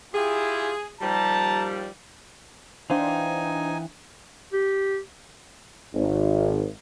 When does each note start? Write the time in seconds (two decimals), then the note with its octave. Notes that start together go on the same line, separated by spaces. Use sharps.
0.14 E4 F4 G4 G#4
1.01 D#2 F3 G3 A5 A#5
2.90 E3 D4 D#4 C5 F5 G5 G#5
4.53 G4
5.94 G#1